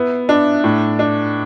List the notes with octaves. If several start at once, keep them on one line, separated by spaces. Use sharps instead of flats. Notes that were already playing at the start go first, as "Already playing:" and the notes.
Already playing: B3 E4
D4
A2
D4